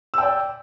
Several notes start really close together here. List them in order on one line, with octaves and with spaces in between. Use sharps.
E6 G5 D5